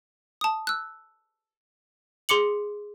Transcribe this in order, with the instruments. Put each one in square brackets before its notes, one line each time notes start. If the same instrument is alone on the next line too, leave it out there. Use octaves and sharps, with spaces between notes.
[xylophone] A5 D#6
E6 F#6
G#4 C6 D6 C#7 F#7